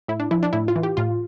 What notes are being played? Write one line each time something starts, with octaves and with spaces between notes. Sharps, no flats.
A2 E4
D4
F3 E4
D4
A2 E4
F4
E3
G4
A2 F4